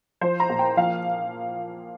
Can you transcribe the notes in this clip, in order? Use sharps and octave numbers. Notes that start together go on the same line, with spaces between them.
F3 C5
A#5
A#2
G5
F3 F5